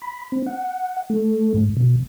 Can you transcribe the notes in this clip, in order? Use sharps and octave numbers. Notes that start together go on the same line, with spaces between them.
B5
C4
F#5
A3
G#2
B2